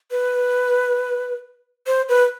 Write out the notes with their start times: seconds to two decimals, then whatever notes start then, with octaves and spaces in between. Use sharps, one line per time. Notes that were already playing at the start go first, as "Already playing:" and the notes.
0.11 B4
1.87 C5
2.09 B4